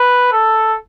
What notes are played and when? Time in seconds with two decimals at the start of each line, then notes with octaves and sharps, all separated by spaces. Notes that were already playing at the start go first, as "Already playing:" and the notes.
Already playing: B4
0.32 A4